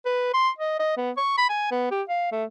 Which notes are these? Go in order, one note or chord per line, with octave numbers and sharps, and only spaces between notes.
B4
C6
D#5
D#5
B3
C#6
B5
G#5
B3
G4
F5
A3